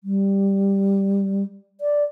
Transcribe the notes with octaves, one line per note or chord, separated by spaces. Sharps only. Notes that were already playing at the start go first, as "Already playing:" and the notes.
G3
D5